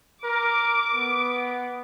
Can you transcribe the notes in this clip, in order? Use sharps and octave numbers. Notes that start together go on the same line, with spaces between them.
A#4 D6
B3